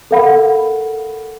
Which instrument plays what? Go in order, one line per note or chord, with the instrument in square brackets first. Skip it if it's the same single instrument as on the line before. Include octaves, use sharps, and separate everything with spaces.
[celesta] A4 A#4 F5 F#5 B5